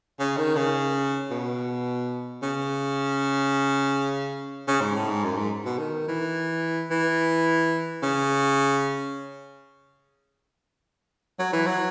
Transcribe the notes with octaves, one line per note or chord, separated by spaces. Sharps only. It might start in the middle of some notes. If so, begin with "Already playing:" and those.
C#3
D#3
C#3
B2
C#3
C#3
G#2
A2
G#2
F#2
G#2
B2
D#3
E3
E3
C#3
F#3
E3
F#3